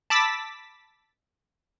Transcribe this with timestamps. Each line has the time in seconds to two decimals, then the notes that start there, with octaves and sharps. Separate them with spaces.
0.10 A5 B5 D6 E6 A6 B6